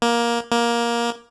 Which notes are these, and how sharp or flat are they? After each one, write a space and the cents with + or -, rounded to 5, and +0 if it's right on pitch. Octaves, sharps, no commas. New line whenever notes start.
A#3 +15
A#3 +15